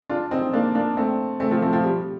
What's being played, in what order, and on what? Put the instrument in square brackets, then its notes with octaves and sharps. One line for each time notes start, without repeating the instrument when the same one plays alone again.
[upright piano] D4 F4
C4 D#4
A#3 D4
A#3 D4
A3 C4
A3 C4
F3 A3
A3 C4
F3
G3